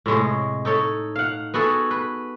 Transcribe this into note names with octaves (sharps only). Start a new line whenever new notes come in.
A2 C3 G#3 C#5
D#4 A4 C#5
F5 F#5
B3 F#4 G#4 A4
B4